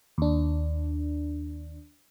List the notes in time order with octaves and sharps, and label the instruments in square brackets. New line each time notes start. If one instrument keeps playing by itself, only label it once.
[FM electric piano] D#2 D4